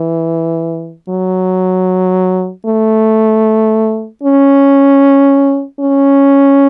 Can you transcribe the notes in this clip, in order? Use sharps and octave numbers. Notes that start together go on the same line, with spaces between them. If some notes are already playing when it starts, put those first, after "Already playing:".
Already playing: E3
F#3
A3
C#4
C#4